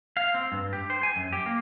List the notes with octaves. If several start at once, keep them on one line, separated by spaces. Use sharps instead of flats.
F5
C4
G2
G4
C5
G#5
F#2
G4
A#3